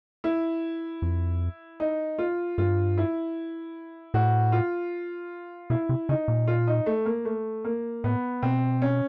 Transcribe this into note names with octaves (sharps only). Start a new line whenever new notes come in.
E4
F2
D#4
F4
G2 F4
E4
A2 F#4
F4
B2 E4
C3
C#3 D#4
A#2
F4
D#4
A3
A#3
A3
A#3
A2 B3
B2 C4
C#4